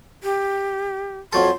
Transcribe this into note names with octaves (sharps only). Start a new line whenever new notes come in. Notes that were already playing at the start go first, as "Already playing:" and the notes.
G4
F2 F#3 A4 C6